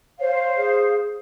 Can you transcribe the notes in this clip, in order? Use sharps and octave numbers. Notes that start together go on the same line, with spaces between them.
C5 C#5 F5
G#4